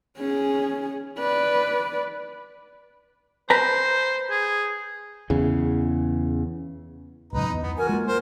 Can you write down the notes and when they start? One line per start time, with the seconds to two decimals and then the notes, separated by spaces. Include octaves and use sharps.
0.18 C#4 G#4
1.19 B4 D5
3.50 B4 C5 A#5
4.30 G#4
5.30 E2 C#3
7.33 D1 C#2 F#2 D#4 B4 A#5
7.49 E2
7.63 B3
7.78 F#4 A#4 G#5
7.89 G#3 A#3 F4
8.07 A#4 C5